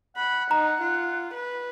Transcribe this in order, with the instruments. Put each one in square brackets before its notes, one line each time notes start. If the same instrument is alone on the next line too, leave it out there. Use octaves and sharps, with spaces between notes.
[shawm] F#5 [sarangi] B5
[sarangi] D#4 [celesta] A#5
[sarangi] F4
B4